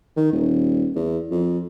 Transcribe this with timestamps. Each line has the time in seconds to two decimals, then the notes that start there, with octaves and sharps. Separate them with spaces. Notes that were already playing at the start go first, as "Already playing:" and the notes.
0.17 D#3
0.33 D#1
0.96 E2
1.31 F2